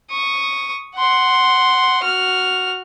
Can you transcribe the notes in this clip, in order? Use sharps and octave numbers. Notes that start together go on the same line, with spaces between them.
C#6 D#6
F#5 C6
F#4 F6